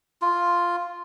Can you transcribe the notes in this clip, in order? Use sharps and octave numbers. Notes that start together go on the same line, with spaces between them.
F4